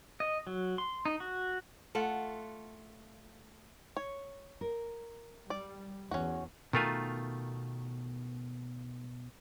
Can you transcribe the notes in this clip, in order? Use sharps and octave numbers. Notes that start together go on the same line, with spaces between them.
D#5
F#3
C6
D#4
F#4
A3 F4 F#5
C#5
A#4
G3 D5
E2 C#4 F#4
B2 D#3 A3 F4 A#4 G#5